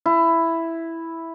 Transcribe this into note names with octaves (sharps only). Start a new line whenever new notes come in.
E4